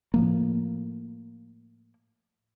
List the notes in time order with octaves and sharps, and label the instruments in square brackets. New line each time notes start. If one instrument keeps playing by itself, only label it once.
[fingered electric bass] A2 F3 A#3